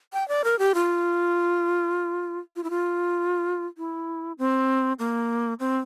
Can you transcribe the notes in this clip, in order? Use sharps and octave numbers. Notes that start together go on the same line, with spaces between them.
G5
D5
A#4
G4
F4
F4
E4
F4
E4
C4
A#3
C4